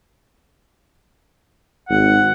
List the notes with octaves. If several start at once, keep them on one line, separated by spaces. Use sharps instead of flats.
G#1 F#5